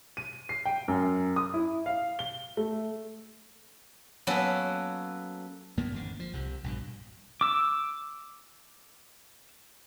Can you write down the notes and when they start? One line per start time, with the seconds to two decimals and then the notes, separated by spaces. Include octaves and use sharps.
0.17 D#7
0.49 C7
0.65 G5
0.88 F#2
1.36 D#6
1.54 E4
1.86 F5
2.19 G7
2.57 A3
4.27 F#3 A#3 B3 C#4 A4
5.77 F#2 A#3 B3
5.92 G#1 F2 D3
6.20 F3
6.33 C2 C3
6.64 A#1 G2 B2
7.41 D6 E6